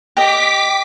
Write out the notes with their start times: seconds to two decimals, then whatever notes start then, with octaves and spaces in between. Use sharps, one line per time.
0.17 G4 D#5 D6 B6